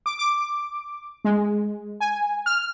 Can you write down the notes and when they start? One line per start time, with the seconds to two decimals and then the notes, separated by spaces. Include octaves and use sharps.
0.06 D6
0.19 D6
1.25 G#3
2.00 G#5
2.46 F6